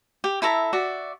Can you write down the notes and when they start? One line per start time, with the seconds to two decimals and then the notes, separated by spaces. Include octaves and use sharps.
0.24 G4
0.42 E4 A4 E5 A#5
0.73 F#4 D5 E5